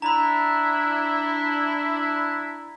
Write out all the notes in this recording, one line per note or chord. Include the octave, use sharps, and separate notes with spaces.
D4 E4 A#5 B5